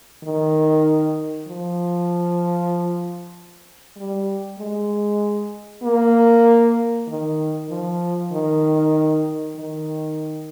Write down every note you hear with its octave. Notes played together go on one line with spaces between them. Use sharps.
D#3
F3
G3
G#3
A#3
D#3
F3
D#3
D#3